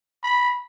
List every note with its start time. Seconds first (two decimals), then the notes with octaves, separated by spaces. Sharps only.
0.23 B5